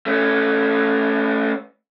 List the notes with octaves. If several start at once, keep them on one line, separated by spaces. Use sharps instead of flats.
A3 C#4